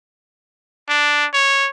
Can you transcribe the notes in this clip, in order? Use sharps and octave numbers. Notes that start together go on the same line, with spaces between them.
D4
C#5